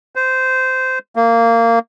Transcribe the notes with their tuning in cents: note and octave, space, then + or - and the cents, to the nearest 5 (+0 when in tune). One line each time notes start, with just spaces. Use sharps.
C5 -15
A#3 -20